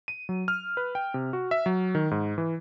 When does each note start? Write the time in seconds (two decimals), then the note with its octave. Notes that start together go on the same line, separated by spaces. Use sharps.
0.08 D#7
0.29 F#3
0.48 F6
0.77 B4
0.95 G5
1.14 C3
1.33 F#4
1.51 E5
1.66 F#3
1.95 D#3
2.11 G#2
2.38 E3